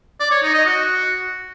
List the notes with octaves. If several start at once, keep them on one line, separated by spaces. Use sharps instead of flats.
D5
C#5
D#4
D#5
F#4